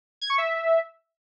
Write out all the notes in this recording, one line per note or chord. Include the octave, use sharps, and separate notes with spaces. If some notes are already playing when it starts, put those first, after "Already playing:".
G#6
C#6
E5